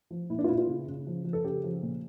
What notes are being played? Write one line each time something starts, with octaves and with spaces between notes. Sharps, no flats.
F3
A#2 E4
D4
F4
A#2 E4
F4
C#3
C#3
F3
F3
A4
C#3 G4
F3
A#2